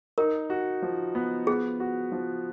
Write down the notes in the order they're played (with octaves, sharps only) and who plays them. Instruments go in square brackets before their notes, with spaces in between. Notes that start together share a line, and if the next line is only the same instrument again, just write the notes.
[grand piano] D#4 [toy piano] A#4
[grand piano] F#4
F3
B3
[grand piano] B3 [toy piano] G#4
[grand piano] F#4
F3